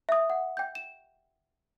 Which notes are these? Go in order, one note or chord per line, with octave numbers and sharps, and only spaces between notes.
E5 D#6
F#5
G5 G6
E7